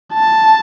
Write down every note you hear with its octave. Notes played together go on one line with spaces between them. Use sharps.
A5